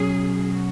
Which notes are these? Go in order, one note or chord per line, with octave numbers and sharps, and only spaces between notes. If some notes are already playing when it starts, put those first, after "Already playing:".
Already playing: B2 F#3 C#4 G#4
F#4